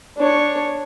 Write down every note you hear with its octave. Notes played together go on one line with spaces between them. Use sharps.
D4 C#5